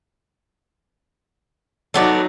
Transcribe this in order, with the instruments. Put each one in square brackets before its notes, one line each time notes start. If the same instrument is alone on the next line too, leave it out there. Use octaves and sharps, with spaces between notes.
[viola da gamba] F#3 D#4 [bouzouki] A3 B3 D5